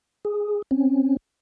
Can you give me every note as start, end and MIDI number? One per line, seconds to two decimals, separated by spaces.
0.25 0.62 68
0.71 1.17 60
0.71 1.17 61